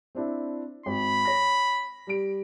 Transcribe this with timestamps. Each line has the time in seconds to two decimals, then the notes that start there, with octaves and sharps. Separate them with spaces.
0.15 C4 D4 E4
0.86 G#1 B5
1.25 C#5 A#6
2.07 G3 D7